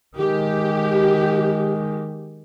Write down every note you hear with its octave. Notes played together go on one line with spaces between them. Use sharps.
D#3 G#3 G4